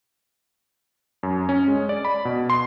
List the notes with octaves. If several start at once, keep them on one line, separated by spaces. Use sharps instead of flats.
F#2
C#4
G#3
D5
B5
B2
C6